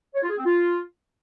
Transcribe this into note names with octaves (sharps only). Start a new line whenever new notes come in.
C#5
F4
G#4
C4
F4